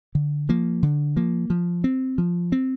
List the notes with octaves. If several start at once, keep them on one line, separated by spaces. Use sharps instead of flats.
D3
F3 A#3
D3
F3 A#3
F3
C4
F3
C4